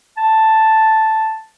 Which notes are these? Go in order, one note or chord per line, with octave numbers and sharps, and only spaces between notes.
A5